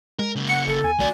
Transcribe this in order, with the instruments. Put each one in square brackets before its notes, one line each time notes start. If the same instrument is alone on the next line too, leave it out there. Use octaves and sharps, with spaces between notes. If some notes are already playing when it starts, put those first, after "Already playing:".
[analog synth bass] G#3 [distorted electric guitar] A#4
[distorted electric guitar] C#3 A#3
[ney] F#5 [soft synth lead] C#7
[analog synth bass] G#1 [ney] A4
[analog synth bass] E2 [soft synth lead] G#5
[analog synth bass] C2 [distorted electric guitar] A3 F#4 [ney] D5